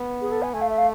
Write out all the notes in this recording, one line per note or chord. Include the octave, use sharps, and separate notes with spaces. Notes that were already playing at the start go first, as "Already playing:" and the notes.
Already playing: B3
G#4
A4
G#5
A3 G#5
F5
E5
F5